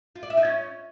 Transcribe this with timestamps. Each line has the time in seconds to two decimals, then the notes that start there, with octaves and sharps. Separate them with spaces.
0.15 F4
0.23 D5
0.30 E5
0.37 D#4
0.45 C#4